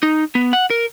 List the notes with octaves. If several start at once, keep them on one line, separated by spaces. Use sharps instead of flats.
D#4
B3
F#5
A#4